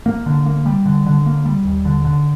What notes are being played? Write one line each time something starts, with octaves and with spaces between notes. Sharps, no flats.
A#3
D3
A#3
G3
D3
D3
A#3
G3
D#2
D3
D3